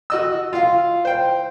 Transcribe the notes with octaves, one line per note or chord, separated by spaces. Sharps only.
F#4 D#5 E6
F4 F5
C5 G5